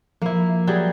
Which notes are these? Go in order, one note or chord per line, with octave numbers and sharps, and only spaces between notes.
F3 A#3 E4
F#3 G3 G#4